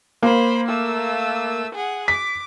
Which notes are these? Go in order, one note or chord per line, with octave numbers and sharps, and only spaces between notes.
A#3 C5 B5
A3 E6
G#4 F#5
D6 B6